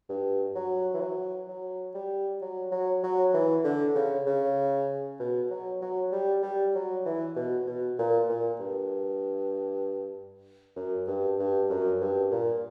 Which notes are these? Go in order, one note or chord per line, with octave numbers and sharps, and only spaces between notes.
G2
F#3
E3
F#3
F#3
G3
F#3
F#3
F#3
E3
D3
C#3
C#3
B2
F#3
F#3
G3
G3
F#3
E3
B2
B2
A#2
A#2
G2
F#2
G2
G2
F#2
G2
A#2